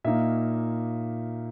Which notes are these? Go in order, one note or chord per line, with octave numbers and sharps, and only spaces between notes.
A#2 A#3 D#4 E5